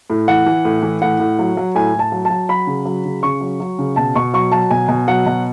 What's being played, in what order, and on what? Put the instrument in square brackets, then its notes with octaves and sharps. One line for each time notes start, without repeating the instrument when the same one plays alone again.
[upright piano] A2
E3 F#5
E3
A2
E3
A2 F#5
A2
F#3
F#3
A2 G#5
A2 A5
F#3
F#3 A5
F#3 B5
C#3
F#3
C#3
C#3 C#6
F#3
F#3
C#3
B2 A5
B2 C#6
F#3 C#6
F#3 A5
B2 G#5
B2
F#3 F#5
B2